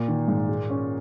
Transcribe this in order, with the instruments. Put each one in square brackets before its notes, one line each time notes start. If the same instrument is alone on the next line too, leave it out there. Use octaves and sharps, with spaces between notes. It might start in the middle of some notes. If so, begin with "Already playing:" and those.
Already playing: [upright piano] A#2 [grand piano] A#3
[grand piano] D#3
G#2
G#3
C#4